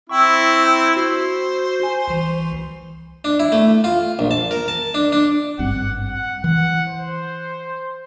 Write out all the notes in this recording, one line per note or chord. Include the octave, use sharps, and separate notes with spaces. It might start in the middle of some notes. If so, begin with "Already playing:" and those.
C4 E4 G5 C#6
F#4 C5
G#5
C2 E3
D4
E4
A3
F4
A#1
A5
A#4
A5
D4
D4
G#1 G2 C4 F#5
F#5
E3 F#5
C5